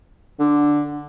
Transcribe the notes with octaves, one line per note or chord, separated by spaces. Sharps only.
D3